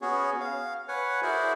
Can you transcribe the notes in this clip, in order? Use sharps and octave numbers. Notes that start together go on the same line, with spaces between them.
B3 C#4 F#4 G#4 C#5
F5
B4 C#5 F#5 G#5
E4 F#4 G#4 A#4 C5 D5